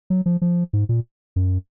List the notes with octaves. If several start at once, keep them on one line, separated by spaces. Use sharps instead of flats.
F#3
F3
F3
G#2
A#2
F#2